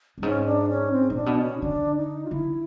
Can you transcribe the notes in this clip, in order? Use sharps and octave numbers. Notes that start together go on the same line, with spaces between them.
G2
G#2 C#4
C#4
D4
C#4
C4
A#2 D#4
D4
B2
C#4
D#4
D3 D4
D#4
F4
D3 E4